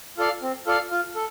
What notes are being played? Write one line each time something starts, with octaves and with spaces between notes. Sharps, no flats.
F4 A4 D5 F5
C4
F4 A4 D5 F5
F4
A4